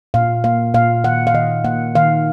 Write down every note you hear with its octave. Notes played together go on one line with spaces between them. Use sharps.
A#2 F5
A#3 F5
A#2 F5
D#3 F#5
F5
D#3 D#5
A#3 F#5
D#3 F5